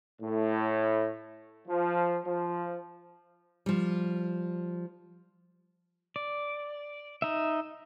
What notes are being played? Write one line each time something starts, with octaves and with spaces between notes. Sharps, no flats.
A2
F3
F3
F3 G3
D5
D#4 E5